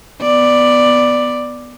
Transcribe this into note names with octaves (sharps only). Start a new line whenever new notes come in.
B3 D5